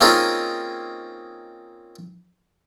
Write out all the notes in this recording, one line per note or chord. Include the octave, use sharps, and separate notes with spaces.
A#3 C4 C#4 D#4 F4 G#4